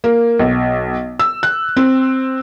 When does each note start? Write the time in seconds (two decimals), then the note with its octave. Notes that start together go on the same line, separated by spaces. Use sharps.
0.04 A#3
0.40 B1
1.19 E6
1.43 F#6
1.77 C4